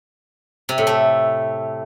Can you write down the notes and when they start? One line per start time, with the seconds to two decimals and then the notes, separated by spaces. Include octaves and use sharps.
0.69 C3
0.78 A2
0.87 A3